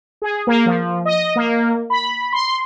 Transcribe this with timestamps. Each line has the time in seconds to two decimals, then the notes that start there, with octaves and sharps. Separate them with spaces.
0.22 G#4
0.47 A#3
0.66 F3
1.05 D#5
1.36 A#3
1.90 B5
2.32 C6